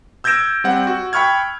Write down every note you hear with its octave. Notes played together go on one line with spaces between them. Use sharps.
E6 G6 G#6 A#6 D7 E7
G3 C4 F#5
F#4
G5 B5 C#6 F6 G#6